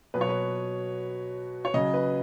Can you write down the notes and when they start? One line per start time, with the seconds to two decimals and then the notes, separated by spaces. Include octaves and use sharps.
0.14 B2 F#3 B4
0.21 C#5
0.29 B4
1.65 C#5
1.74 C#3 F#3 D#5
1.94 B4